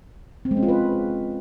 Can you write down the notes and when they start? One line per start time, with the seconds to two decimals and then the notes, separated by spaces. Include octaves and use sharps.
0.45 C4
0.51 G#3
0.57 C#4
0.63 F4
0.69 B4